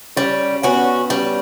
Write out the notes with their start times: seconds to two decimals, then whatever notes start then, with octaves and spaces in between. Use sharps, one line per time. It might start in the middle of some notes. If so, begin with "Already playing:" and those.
0.16 G3 C#4
0.63 B3 C#4 F#4
1.10 G3 C#4